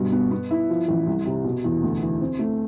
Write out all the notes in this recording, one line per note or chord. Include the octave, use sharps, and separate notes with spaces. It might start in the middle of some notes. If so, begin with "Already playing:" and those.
Already playing: G2 B2
B3
B3
E4
F3
A1
C2
C3
B2
E2
D2
E3
C4
A3